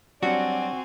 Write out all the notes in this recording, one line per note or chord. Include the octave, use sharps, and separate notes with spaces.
F#3 G3 C4 D4 F#4 D5 G#5